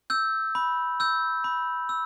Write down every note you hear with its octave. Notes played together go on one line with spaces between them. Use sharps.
E6 G6
B5
E6 G6
B5
E6